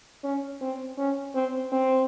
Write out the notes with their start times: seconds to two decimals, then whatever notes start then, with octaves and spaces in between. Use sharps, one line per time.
0.24 C#4
0.61 C4
0.98 C#4
1.35 C4
1.72 C4